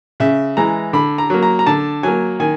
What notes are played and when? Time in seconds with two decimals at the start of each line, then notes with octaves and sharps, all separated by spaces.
0.20 C#3 E5
0.57 E3 G#3 A#5
0.93 D3 B5
1.18 A#5
1.30 F#3 A#3
1.43 A#5
1.59 A#5
1.67 D3 A5
2.03 F#3 A#3 G#5
2.40 D#3 G#5